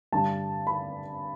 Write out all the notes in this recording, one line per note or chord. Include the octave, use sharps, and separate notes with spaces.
G2 D3 G3 A5
B5